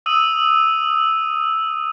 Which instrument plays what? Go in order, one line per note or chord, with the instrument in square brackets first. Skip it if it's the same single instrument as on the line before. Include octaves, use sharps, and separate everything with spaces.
[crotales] D#6 E6 D#7 F#7